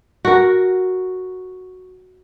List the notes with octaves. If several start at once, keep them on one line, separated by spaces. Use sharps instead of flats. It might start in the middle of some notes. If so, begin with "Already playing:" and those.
F#4 A#4